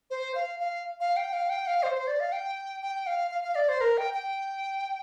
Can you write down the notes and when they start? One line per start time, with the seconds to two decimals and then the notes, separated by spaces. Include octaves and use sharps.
0.10 C5
0.35 F5
0.60 F5
1.00 F5
1.17 G5
1.33 F5
1.50 G5
1.67 F5
1.83 C5
1.95 C5
2.07 D5
2.20 F5
2.32 G5
2.82 G5
3.07 F5
3.31 F5
3.44 F5
3.55 D5
3.69 C5
3.81 A#4
3.98 G5
4.14 G5